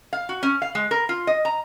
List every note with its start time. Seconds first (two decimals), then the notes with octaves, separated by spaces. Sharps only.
0.13 F5
0.29 F#4
0.43 C#4
0.62 F5
0.75 G#3
0.91 A#4
1.09 F4
1.27 D#5
1.45 A#5